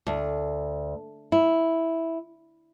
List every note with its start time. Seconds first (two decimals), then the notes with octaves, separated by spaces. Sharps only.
0.07 D2
1.32 E4